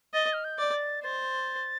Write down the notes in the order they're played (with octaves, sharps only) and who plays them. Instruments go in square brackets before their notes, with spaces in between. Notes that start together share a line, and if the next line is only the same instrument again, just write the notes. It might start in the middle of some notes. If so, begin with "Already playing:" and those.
[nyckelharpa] D#5 [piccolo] A6
[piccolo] F6
G6
[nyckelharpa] D5
[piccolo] A6
[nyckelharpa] C5 [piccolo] A6